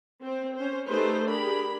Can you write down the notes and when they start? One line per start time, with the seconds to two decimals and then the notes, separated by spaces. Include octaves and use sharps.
0.22 C4 C5
0.55 C#4 C5
0.88 A3 D#4 G4 G#4 B4 C5
1.26 D4 G4 G#4 A#4 B5